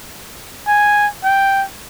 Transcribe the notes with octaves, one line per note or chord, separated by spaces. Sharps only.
G#5
G5